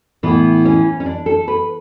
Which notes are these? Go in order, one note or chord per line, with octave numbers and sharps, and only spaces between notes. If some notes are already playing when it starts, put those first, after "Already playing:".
A2 E3 B3
C#4
C#4
D4
A4
B4